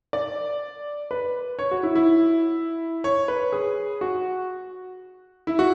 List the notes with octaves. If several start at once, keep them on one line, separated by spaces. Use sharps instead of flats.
D5
B4
C#5
F#4
E4
E4
C#5
B4
G#4
F#4
E4
F#4